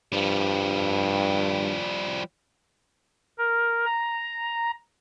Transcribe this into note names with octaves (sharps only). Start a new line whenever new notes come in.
G2 F3 G3
A#4
A#5